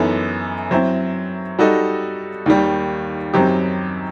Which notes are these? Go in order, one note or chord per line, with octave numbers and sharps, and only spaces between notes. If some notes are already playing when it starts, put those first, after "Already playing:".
Already playing: F#2 E3 B3 D#4 A4
F#3 C4 E4
G3 D#4 F#4 A4 D#5
D#2 D#3 G3
F#2 F#3 C4 D#4 G4